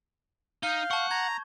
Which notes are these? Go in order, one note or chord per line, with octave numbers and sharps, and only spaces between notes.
D#4 F5 G6 G7
F#5 A5 C#6
A#5 G#6